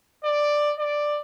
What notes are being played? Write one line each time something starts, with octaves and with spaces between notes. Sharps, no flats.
D5
D5